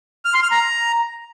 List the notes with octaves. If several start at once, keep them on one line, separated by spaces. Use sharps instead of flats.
F6
C6
F6
A#5